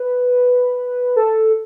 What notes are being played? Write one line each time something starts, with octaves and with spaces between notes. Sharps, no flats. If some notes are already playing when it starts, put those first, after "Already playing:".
Already playing: B4
A4